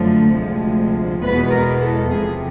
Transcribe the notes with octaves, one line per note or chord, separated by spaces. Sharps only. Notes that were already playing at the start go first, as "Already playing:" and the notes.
Already playing: F#2 D3 F3 A3
D2 C3 F3 G#3
E2 B2 G#3 B3 B4
A#4
A4
E2 C3 F3 G#4